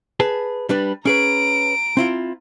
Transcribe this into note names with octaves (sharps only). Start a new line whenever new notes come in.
G#4 B4 A5
G3 D4 B4
C#4 G#4 B4 A#5 D7
C4 E4 F4